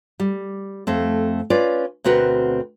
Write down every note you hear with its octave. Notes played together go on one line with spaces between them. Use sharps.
G3
F2 A3 C4
C#4 F4 B4 D5
D2 B2 C4 F#4 A#4 B4